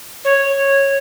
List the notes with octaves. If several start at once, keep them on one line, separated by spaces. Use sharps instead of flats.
C#5